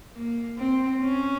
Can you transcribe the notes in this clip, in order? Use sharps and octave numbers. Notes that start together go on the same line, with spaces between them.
A#3
C4
C#4